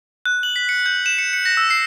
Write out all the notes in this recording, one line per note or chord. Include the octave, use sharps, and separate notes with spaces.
F#6
F#7
B6
C#7
G6
E7
C#7
C#7
A#6
E6
C7